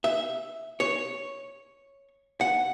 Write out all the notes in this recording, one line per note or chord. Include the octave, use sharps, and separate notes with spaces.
E5
C#5
F#5